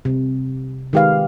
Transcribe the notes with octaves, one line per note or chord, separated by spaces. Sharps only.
C3
D#3 G#3 G4 B4 F5